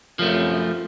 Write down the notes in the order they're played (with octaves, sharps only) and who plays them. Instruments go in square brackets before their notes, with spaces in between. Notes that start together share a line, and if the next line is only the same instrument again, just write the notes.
[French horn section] F#2 C3 F4 [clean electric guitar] F3 A3